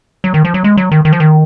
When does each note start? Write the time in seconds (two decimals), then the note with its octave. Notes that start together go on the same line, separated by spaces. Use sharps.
0.24 F#3
0.34 D#3
0.45 F3
0.54 F#3
0.64 G#3
0.77 F#3
0.92 D#3
1.05 D#3
1.13 F3
1.20 D#3